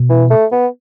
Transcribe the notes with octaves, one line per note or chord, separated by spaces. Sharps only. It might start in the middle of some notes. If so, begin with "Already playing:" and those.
Already playing: B2
E3
A3
B3